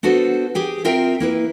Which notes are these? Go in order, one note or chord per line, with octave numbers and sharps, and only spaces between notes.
B3 D4 F#4 A4 B4 C5
G4 G#4 G5
C4 F4 A#4 E5 G5
A#3 E4 B4